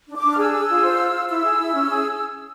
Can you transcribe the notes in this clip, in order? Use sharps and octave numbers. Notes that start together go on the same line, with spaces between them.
D4
D6
D4
F6
G#4 E6
G#4
F4
C5
F4
F4
E4 E6
G#4
E4
C#4
G#4